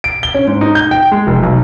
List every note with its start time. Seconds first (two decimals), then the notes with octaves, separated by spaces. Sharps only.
0.04 D7
0.23 G7
0.34 C#4
0.47 G#2
0.61 D#4
0.75 G6
0.91 G5
1.12 G#3
1.27 F1
1.43 B1